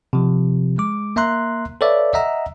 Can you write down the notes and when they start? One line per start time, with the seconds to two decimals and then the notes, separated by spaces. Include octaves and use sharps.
0.13 C3 F3
0.78 G#3 D6
1.16 A#3 E5 A#5 C6 F#6
1.81 A4 B4 C#5 D5 E5 F5
2.13 D#5 E5 F#5 A#5 E6